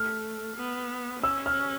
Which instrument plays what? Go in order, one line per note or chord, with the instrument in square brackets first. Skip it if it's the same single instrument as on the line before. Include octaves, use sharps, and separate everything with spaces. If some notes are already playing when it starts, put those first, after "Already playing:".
Already playing: [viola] A3 [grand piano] F6
[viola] B3
[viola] C#4 [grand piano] E6
[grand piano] F6